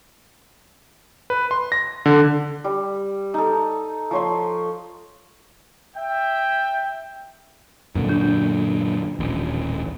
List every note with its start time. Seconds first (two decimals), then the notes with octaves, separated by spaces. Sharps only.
1.30 B4
1.51 C6
1.72 A#6
2.06 D3
2.64 G3
3.34 D#4 A4
4.11 F3 C#5 C6
5.97 E5 G5
7.95 F#2 A#2 D3
8.09 D4
9.19 D#1 A1